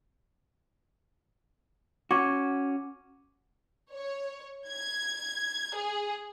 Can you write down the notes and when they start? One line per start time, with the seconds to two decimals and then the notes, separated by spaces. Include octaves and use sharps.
2.11 C#4 F#4 C#6 D6 G#6
3.93 C#5
4.69 G#6
5.76 G#4